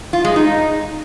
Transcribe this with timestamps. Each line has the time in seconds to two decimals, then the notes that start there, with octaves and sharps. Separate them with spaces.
0.13 F4
0.24 G#3
0.36 D#4